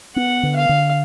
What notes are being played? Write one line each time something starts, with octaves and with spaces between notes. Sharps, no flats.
B3 F#5
D3
F5
D3